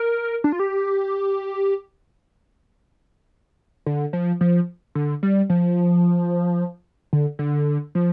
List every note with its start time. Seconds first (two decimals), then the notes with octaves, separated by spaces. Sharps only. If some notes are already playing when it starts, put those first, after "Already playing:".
Already playing: A#4
0.44 D4
0.52 F4
0.59 G4
3.86 D3
4.13 F3
4.41 F3
4.95 D3
5.23 G3
5.50 F3
7.13 D3
7.39 D3
7.95 F3